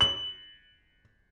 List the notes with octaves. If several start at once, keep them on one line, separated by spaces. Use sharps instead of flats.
F#7